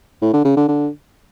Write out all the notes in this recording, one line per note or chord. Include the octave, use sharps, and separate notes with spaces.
A2
D3
C#3
D3
D3